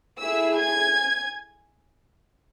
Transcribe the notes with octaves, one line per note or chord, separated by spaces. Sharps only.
A3 E4 G#4 E5 E6
G#5 G#6